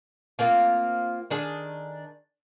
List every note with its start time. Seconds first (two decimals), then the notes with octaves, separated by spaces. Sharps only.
0.39 A#3 C4 F4
1.30 D#3 D4 G#4